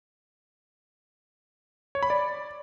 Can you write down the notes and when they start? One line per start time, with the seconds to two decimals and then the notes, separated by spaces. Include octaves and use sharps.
1.95 C#5
2.03 B5
2.10 D5